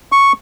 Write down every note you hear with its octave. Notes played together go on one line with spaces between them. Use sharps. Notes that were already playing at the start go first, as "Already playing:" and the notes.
C#6